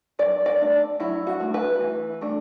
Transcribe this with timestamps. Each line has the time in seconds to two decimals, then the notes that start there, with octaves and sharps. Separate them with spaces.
0.19 F#3 D5
0.46 D5
0.60 A3 D4
1.00 F#3 E4
1.27 F#4
1.40 A3 D4
1.54 B4
1.81 E3
2.21 A3 D4